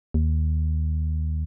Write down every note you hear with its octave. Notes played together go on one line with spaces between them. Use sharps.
D#2